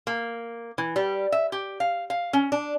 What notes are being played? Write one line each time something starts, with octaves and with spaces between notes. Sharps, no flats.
A#3
E3
G3
E5
G4
F5
F5
C#4
D4